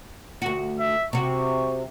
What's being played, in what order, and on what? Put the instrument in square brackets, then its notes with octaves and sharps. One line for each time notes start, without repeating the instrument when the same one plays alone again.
[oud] D2 F#4
[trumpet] E5
[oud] C3 F#4 [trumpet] C#6